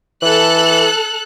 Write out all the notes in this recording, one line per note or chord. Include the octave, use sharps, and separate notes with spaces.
E3 A4 F#6